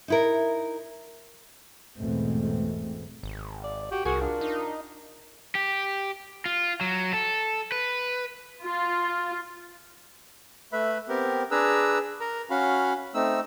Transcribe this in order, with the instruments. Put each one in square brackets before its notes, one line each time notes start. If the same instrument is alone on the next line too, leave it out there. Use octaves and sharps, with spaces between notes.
[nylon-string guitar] D#4 E4 A#4
[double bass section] G#1 E2 B2 G#3 A3 C4
[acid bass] G#1
[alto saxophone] D5
[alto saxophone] F#4 [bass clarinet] G4
[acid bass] C2 [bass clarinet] F#4 [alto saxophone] G#4 [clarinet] A#4
[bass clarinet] D4 [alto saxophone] F4
[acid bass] D#4
[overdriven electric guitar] G4
F4
F#3
A4
B4
[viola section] F4
[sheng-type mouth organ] A3 B4 E5 B5
B3 C4 G4 A#4
D4 G#4 B4 A#5 E6
A#4 A#5
C#4 F#4 F5 B5
A3 C4 D#4 E6